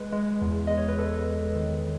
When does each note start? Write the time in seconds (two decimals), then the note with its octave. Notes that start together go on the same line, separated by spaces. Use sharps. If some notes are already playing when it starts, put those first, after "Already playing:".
Already playing: G#3 B4
0.13 G#3
0.42 E2
0.67 G#3 D#5
0.77 C#5
0.88 B4
0.99 E2 A4
1.27 G#3
1.55 D#3